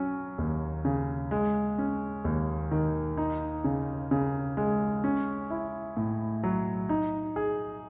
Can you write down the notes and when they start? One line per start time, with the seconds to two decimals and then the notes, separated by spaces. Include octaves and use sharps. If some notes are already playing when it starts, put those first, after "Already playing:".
Already playing: F#3 C#4
0.38 D#2
0.85 C#3
1.31 G#3
1.78 C#4
2.25 D#2
2.71 D#3
3.17 D#4
3.64 C#3
4.11 C#3
4.57 G#3
5.04 C#4
5.50 E4
5.97 A2
6.44 F#3
6.89 D#4
7.36 G#4